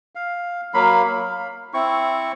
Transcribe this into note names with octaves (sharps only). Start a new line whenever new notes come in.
F5
F#3 A#3 F5 B5
F5
C4 E4 C#6